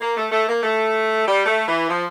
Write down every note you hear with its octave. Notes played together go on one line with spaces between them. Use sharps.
A#3
A3
A3
A#3
A3
G3
A3
E3
F3